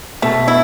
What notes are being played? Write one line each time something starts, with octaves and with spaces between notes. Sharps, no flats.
B2 A3
E4